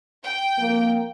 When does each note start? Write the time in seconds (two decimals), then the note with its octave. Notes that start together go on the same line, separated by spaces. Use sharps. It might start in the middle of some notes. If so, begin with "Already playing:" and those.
0.24 G5
0.58 F2 A#3